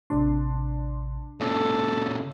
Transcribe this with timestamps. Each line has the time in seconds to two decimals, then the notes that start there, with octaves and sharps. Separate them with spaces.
0.10 A1 C3 D4 C6
1.41 A#2 C#3 A4 C#5